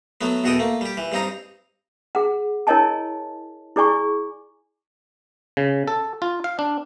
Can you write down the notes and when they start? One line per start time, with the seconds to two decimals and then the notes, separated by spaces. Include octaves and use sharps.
0.21 F#3 A3 B3
0.44 E2 B2 F#4 A4 D#5 G5
0.59 A3 A#3
0.81 G3 G4
0.97 E3
1.12 G2 G3 C4 D#4 A#5
2.15 G#4 F#5
2.67 E4 A#4 C#5 D#5 G#5 A5
3.76 E4 G#4 D5 G#5 C#6
5.57 C#3
5.88 A4
6.22 F4
6.44 F5
6.59 D4